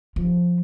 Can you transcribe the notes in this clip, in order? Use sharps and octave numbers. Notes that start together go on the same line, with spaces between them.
F3